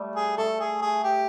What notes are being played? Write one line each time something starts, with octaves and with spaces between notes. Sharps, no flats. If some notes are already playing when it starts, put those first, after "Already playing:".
Already playing: G3 A3
G#4
A3 A4
G#4
G#4
G4